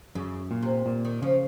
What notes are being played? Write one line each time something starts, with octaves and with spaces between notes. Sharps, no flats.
F#2 C#3
A#2
C3
A#2
D#3
C#3 F3